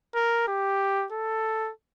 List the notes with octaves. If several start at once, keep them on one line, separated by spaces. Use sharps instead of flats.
A#4
G4
A4